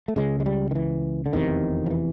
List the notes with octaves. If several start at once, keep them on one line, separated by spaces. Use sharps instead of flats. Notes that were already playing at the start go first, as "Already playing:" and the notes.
A3
C#2 C#3 G#3
G#3
G3
D#3
E3
D3
F1 E2 C3 D#3
F3
E3